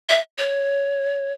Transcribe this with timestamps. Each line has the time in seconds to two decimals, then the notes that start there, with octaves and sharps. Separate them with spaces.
0.09 E5
0.38 C#5